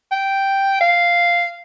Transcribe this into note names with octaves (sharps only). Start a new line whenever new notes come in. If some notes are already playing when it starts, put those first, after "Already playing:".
G5
F5